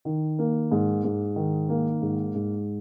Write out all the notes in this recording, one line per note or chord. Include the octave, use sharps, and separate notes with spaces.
D#3
A#3
G#2
G#2
D#3
A#3
G#2
G#2